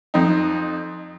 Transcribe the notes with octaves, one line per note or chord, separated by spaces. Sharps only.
F2 D#4